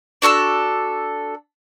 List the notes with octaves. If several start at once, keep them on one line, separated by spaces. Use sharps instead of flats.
D4 F#4 A4 E6